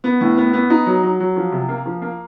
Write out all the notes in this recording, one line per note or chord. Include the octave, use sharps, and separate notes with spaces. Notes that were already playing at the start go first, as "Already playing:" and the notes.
B3
A2
B3
B3
D#4
F#3
F#3
F#3
F3
C3
A#3
F3
A#3